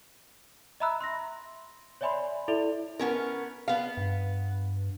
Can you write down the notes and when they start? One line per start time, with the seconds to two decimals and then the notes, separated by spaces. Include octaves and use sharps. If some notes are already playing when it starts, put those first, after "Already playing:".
0.80 D#5 E5 A#5 B5 E6 F#6
1.01 C6 A#6
2.01 C#5 D5 E5 G#5 B5 C6
2.48 E4 A4 D5 E5 F7
2.99 B3 C#4 A#4
3.68 B3 F5
3.97 G2